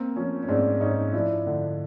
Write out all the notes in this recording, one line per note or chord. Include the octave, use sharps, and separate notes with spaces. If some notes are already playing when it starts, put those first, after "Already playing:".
Already playing: A#3 C4
F3 C#4
C#4
G#2 C4 D4
G#2 C#4 D#4
F3 D4 E4
D3